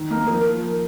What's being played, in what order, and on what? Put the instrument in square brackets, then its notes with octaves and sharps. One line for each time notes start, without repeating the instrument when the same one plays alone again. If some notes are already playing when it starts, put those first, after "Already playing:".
Already playing: [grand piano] D#3
A#3 D#4 A#4
[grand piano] F3 [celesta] A#4